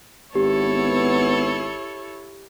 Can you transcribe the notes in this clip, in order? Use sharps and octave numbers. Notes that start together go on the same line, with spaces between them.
G#1 B3 E4 G4 A4 C#5